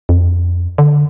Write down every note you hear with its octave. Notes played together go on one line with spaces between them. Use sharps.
F2
D3